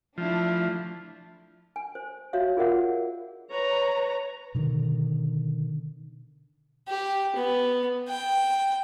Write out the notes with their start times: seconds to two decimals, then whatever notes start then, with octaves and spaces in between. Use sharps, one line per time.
0.18 F3 A3 D4 E4
1.76 G#5
1.95 C5
2.33 F#4 C#5 D5 E5 F5
2.57 F4 G#4 A#4 D5 E5 F#5
3.51 B4 C#5 A#5
4.55 B2 D3 D#3
6.88 G4
7.36 B3
8.08 G5